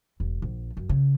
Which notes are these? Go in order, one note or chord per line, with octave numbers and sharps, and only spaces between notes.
E1
A#1
F#2
C#3